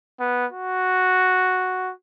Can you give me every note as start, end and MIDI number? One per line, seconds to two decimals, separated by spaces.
0.20 0.46 59
0.52 1.92 66